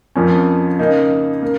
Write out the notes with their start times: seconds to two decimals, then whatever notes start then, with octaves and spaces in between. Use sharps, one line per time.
0.16 F2 F3 A#3 C#4
0.79 C#3 A#3 D#4
1.42 A#3